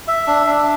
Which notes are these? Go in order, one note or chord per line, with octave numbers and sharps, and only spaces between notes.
E5
D4
D4